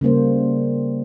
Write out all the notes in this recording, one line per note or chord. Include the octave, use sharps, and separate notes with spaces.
C#3 G3 A#3 C5